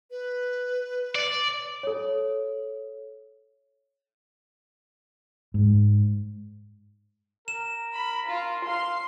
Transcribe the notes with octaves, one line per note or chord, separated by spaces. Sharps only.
B4
D5
A4 C#5
G#2
A#4 E7
B5
F4
F5 C6